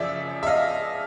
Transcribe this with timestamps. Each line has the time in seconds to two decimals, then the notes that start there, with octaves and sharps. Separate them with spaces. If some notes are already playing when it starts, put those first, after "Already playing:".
Already playing: F#2 C#3 F3 D5 E5
0.43 E5
0.47 D#5 F5